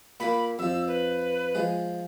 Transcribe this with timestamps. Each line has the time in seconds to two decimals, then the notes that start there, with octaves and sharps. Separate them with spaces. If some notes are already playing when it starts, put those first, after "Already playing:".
0.20 A#2 A#3 B5
0.59 F2 F3 E6
0.88 B4
1.55 F3 G#3